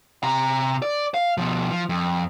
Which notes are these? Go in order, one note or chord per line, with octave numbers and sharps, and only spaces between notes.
C3 A#5
D5
F5
B2 F3
F3
F2